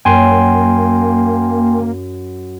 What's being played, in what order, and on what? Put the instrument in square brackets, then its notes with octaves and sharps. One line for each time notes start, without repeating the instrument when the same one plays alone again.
[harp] F#2 [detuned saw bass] A#3 [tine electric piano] G5 G#5 C6